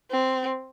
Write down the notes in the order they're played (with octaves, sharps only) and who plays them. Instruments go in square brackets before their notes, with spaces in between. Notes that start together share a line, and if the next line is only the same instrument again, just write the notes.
[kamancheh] C4